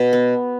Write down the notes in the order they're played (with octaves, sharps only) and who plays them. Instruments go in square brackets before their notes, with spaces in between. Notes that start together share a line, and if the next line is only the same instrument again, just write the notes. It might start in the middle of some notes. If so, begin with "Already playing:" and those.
Already playing: [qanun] B2
B3